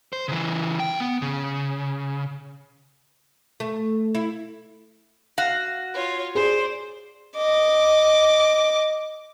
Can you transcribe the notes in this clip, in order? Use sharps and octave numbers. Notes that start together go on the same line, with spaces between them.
C5
C#3 E3
E2 G5
B3
C#3
A3
E4
F#4 F5
F4 C#5
G#4 C5 D5
D#5 D6